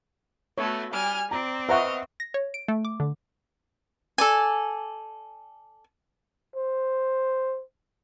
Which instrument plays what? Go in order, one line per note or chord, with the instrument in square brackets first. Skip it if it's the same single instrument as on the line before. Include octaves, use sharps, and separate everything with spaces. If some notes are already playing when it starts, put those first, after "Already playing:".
[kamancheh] A3 [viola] B3 F#4 [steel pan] C#5
[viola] G3 [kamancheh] G#5 F6
[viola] C4 [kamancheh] D5 [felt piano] A#5
[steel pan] B4 C5 A#5 [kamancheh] D#5 F6 [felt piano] E5 F#5 C#6
[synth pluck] A#6
C#5
D7
A3
D6
D3
[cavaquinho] A4 D5 G#5
[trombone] C5